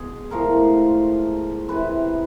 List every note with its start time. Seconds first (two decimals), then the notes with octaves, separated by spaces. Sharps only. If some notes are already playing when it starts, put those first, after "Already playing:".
Already playing: B2 G#3 G#4
0.31 A2 F3 G#3 A#4
1.68 C3 E3 G#3 B4